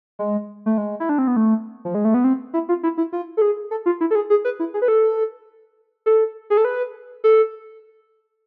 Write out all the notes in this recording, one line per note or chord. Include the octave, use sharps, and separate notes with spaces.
G#3
A3
G#3
E4
D4
C4
B3
A3
F3
G#3
A3
B3
C4
E4
F4
E4
E4
F4
A4
G#4
A4
F4
E4
A4
G#4
G#4
B4
E4
G#4
B4
A4
A4
G#4
A4
B4
A4